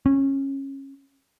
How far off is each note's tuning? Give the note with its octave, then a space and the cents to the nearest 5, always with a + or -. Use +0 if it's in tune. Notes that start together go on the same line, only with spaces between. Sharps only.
C#4 -20